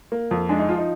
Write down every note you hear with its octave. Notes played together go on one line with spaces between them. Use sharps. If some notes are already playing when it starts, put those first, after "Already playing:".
A#3
F2
G#3 D4
D#4
F3 F4
D#4